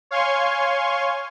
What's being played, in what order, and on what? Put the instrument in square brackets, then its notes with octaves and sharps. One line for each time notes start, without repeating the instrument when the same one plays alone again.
[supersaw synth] C#5 F5 G#5 C6 C#6